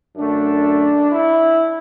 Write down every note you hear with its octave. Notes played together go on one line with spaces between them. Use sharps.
F#2 D3 A3 D4
E4